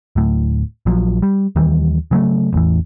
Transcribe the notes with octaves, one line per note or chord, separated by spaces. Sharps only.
D1 A2
A#1 F3 F#3
G3
D#2 D#3 E3 G3
C#3 F#3 G#3 A3
A1 E2 E3